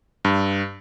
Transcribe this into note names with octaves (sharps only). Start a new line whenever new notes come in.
G2